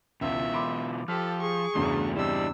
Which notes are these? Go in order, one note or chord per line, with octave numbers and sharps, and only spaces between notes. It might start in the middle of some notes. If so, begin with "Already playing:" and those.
C#2 B2 E3 F4 E5
B5 C6 D6
F3 G4 A4 F6 B6
G#4 C#6
E2 G2 C#3 A3 D4 F#4
G3 C4 D4 E4 E6